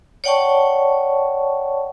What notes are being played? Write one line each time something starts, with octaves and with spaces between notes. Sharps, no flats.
C#5 D5 F#5 G5 A5 C#6